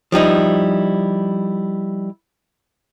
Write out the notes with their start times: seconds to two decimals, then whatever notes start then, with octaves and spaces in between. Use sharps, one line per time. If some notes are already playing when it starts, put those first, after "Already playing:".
0.12 F3 G3 D#4 E4